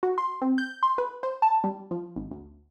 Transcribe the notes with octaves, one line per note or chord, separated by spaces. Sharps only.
F#4
C6
C4
G6
C6
B4
C5
A5
G3
F3
G#1
D2